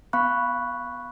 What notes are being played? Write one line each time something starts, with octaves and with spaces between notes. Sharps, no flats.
B3 F5 B5 C#6 F#6